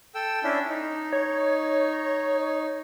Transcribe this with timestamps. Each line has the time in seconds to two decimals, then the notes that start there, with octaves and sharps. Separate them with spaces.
0.15 A4 G5 E6
0.43 C#4 D4 E4
0.69 D#4
1.13 C#5